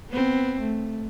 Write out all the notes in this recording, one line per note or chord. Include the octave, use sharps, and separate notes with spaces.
B3 C4
A3